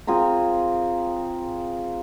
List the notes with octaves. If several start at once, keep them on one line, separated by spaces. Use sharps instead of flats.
C4 F4 G#4 A#4